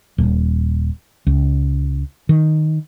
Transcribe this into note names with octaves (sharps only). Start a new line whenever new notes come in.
D#1
C#2
D#3